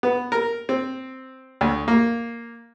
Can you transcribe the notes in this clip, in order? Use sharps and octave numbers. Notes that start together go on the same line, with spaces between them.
B3
A#4
C4
D2
A#3